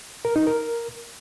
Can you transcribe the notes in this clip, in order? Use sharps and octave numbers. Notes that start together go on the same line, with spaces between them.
A#4
D#4
A#4